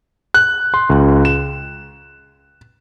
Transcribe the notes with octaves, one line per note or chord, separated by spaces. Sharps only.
F#6
C6
C#2
E7